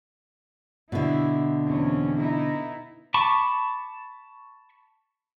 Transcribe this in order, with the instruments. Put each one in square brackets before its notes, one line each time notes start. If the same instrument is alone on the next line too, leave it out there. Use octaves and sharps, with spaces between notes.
[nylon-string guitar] B2 D3 [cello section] E4
[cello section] E2 C4 C#4
B3 D#4 E4
[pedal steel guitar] A5 B5 C#6 D6